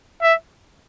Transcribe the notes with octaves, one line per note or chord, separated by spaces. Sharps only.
E5